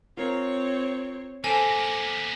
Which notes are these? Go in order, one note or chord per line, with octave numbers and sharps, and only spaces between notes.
C4 F4 A#4 C#5
A#3 B3 A4 C5 G#5 A5 D6